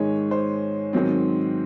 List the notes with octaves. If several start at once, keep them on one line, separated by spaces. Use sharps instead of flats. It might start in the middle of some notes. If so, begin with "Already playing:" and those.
Already playing: G#2 D#3 G#3 C#5
C5
G#2 D#3 F#3 C4